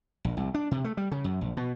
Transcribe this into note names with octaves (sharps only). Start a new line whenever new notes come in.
A#1
C2
D4
C3
A3
G3
C#3
F#2
A#1
B2